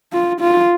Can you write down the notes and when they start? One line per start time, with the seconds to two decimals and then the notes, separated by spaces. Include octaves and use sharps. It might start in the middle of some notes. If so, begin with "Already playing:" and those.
0.13 F4
0.41 F4